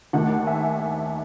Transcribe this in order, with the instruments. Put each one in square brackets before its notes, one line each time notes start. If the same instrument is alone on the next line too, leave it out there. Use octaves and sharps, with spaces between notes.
[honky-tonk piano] D#2 D#3 A3 F#5
E5 G#5